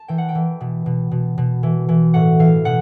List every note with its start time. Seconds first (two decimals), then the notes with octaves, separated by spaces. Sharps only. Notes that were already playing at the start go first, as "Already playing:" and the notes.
Already playing: A5
0.08 E3 G5
0.18 F#5
0.29 G5
0.35 E3
0.61 B2
0.86 B2
1.11 B2
1.38 B2
1.63 E3
1.89 E3
2.14 A2 F#5
2.39 E3 F5
2.65 B2 F#5